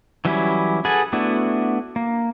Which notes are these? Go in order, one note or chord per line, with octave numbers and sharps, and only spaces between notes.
E3 F#3 G3 C#4 E4
G#4 A4 B4 F#5 G#5
A3 B3 D4 E4 F#4
A#3